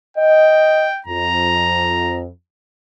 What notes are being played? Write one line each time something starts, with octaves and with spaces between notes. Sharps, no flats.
D#5 G5
F2 A#5